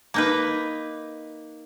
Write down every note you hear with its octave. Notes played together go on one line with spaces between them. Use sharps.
A#3 D#4 B4